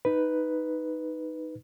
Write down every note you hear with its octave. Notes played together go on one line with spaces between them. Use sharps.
D#4 B4